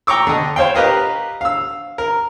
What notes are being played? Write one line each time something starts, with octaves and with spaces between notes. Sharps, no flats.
G5 A#5 C#6 D6 E6
D3 D#5
C5 C#5 F5 G5
G4 A#4 B4 D#5 F5
F5 E6
A#4